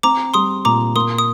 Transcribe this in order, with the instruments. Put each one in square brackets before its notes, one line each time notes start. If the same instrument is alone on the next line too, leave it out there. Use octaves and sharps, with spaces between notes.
[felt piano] C4 [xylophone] A#5 D6
[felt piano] G3 [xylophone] C6 D#6
[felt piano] A#2 [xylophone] A#5 D6
[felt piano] A#3 [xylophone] C6 D#6
[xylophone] D#6